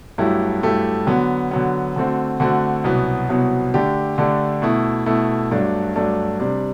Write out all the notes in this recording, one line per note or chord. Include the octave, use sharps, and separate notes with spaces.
G2 F#3 A3 E4 G4
G2 F#3 A3 E4 G4
D3 F#3 B3
D3 F#3 B3
D3 A3 C4 F#4
D3 A3 C4 F#4
C2 B2 F#3 B3
C2 B2 F#3 B3
D3 A3 D4 G4
D3 A3 D4 G4
B2 A3 E4
B2 A3 E4
G2 F#3 A3 D4
G2 F#3 A3 D4
C3 G3 D4